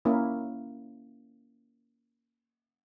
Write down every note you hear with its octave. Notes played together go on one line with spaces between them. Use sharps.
A#3 C#4 E4